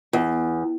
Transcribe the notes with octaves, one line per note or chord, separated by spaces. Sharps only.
E2